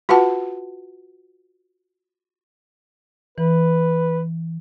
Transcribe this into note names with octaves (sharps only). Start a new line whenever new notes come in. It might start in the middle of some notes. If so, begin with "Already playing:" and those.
F4 F#4 B4 F#5 A5
E3 B4